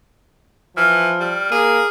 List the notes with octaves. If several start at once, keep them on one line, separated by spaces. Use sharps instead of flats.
E3 F3 F6
G3
A#3 G#4